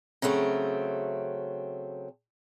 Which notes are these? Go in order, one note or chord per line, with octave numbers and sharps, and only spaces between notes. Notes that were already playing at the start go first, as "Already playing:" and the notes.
C#3 F#3 A3 C4